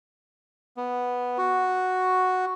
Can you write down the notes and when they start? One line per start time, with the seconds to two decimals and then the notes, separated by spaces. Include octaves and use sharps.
0.77 B3
1.38 F#4